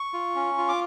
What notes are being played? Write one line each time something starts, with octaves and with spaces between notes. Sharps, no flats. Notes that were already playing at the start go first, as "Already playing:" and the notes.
Already playing: C#6
F4
C#4
F4
D6